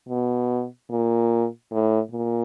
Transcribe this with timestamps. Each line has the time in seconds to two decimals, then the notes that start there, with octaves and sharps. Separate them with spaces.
0.09 B2
0.90 A#2
1.71 A2
2.11 A#2